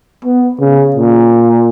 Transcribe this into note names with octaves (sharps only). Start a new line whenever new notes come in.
B3
C#3
A#2